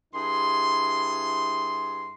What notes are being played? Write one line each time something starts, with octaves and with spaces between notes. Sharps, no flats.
G2 E4 G#4 C6